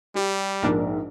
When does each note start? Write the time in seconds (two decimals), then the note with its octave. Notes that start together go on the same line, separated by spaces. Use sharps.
0.15 G3 G4
0.63 A#1 G#2 D4 A#4